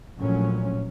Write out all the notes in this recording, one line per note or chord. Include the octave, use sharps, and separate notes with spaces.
A#1 A2 F#3 C#4